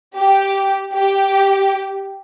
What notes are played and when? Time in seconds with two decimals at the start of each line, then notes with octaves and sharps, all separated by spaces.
0.16 G4
0.93 G4